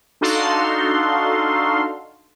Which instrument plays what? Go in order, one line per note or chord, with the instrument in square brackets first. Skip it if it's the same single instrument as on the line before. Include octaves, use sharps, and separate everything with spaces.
[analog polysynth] D4 D#4 F#4 A4 F5 C6